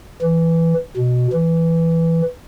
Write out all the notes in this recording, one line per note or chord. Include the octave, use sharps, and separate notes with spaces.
E3
B2
E3